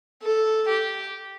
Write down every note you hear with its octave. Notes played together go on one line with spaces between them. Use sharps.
A4
G4